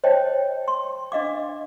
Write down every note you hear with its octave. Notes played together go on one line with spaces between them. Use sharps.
C5 C#5 D#5 G5 A5
C6
D4 D#5 F5 D6